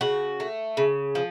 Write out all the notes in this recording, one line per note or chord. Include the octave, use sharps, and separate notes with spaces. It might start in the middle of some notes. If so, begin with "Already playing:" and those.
C#3 F#4
A3
C#3
F3